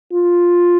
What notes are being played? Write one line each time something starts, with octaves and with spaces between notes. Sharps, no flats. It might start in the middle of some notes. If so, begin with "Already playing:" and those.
F4